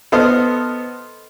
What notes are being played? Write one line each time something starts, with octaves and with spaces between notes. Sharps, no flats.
B3 A4 C5 D#5 F6